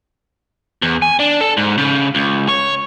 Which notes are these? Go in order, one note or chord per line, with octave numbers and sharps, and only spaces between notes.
E2
G#5
D4
A4
G#2
C#3
C#2
C#5